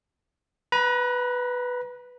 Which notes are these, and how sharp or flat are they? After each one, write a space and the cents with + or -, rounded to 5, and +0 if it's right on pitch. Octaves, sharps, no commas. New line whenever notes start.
B4 +0 A#5 +40